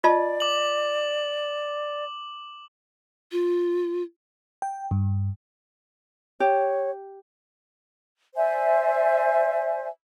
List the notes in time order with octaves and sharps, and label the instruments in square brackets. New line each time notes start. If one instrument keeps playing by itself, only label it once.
[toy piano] F4 D#5 A5 [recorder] D5
[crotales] D6 F#7
[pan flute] F4
[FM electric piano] G5
G2
[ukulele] G4 [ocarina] C#5
[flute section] C5 D5 E5 G#5